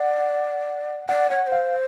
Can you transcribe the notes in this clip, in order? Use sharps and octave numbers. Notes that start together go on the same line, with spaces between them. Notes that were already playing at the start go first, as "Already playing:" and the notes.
Already playing: D5 F#5
D5 F#5
C#5 F#5
C#5
C5
F5